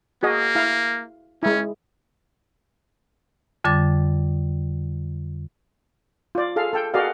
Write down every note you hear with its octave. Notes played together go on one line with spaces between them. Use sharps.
A#3 F#4 G#4 D#5
E4 F5
G#3 C#4 E4
F2 D3 G3 D6 A6
F4 D5
G#4 A4 F5
A4 G5
F#4 G#4 A#4 D5 D#5 F5